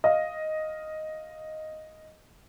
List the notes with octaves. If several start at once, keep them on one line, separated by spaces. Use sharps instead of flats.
D#5 F5